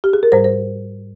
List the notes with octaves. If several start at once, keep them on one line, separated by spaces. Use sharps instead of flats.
G4
G#4
A#4
G#2 G3 C5
C5